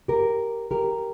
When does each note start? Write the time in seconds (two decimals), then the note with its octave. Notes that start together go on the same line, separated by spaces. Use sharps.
0.08 G4 A#4
0.71 G4 A#4